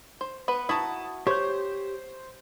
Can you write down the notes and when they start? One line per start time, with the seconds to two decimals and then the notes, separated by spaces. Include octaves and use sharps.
0.21 C5
0.48 B3 B4
0.69 E4 F#4 A5 A#5 D#6
1.27 G4 C5 C#5 G6